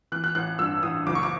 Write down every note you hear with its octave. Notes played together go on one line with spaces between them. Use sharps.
E3 F#6
F#6
A1 F#6
G2 E6
A1 D#6
F#1 D6
C#6
D6